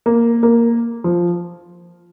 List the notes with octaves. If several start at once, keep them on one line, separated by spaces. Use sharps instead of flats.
A#3
A#3
F3